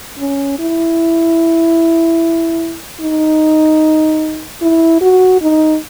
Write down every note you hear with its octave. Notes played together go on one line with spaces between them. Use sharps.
C#4
E4
D#4
E4
F#4
D#4